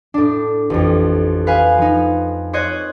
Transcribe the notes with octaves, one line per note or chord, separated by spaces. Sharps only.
A2 D4
A1 F2
B4 F5 G#5
F3 D#4
C5 C#5 D#5 F#6 G#6